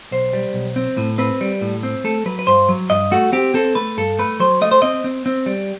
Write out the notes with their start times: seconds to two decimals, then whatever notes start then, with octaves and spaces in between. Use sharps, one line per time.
0.11 B1 C5
0.33 G3
0.54 B1
0.76 C4
0.97 A2
1.18 C4 B4
1.41 G3
1.61 A2
1.83 C4
2.04 A3 A4
2.26 F#3 B4
2.39 B4
2.47 G2 C5
2.69 F#3
2.90 G2 D#5
3.11 A3 F#4
3.33 C4 G4
3.54 C4 A4
3.75 A3 B4
3.97 G2 A4
4.19 A3 B4
4.40 F#3 C5
4.61 A3 D#5
4.71 C5
4.82 C4 D#5
5.04 C4
5.26 C4
5.46 G3